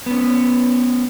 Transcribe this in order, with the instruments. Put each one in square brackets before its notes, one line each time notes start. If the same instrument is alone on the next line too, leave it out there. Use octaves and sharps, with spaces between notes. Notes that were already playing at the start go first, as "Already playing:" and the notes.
[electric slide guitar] B3 C#4